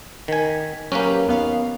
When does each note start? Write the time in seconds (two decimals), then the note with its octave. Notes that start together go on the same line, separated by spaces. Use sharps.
0.28 D#3 G#5 B6
0.92 F#3 A#3 C#4 G4 B4
1.27 D#2 B3 F5